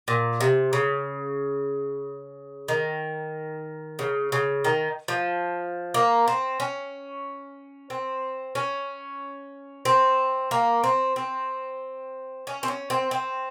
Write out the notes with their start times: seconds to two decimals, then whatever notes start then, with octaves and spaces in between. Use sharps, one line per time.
0.08 A#2
0.41 C3
0.73 C#3
2.68 D#3
3.99 C#3
4.32 C#3
4.65 D#3
5.08 F3
5.94 A#3
6.28 C4
6.60 C#4
7.90 C4
8.55 C#4
9.85 C4
10.51 A#3
10.84 C4
11.16 C4
12.47 C#4
12.63 C4
12.68 C#4
12.90 C4
13.11 C4